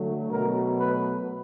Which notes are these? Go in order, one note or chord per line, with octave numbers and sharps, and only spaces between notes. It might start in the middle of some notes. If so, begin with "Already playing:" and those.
Already playing: D3 F#3 A3
B2 F#3 A3 A#4
B4